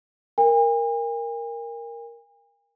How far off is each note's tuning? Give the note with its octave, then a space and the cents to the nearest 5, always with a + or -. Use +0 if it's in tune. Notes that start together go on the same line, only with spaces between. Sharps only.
A#4 +0 G#5 -45